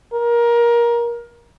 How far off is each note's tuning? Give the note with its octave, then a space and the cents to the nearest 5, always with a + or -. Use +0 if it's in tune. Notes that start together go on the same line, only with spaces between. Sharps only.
A#4 +20